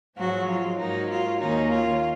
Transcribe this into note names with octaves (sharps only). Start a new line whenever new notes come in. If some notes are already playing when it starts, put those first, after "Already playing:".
G#2 F3 F#3 G#3 C#4 F#4
F4
G#2 F#3 A#3 D#4
F4
D#2 D#3 A#3 C#4 D#4
F4